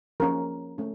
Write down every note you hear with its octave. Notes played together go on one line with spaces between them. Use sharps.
F3 A#3 C#4 A#4
A3 C#4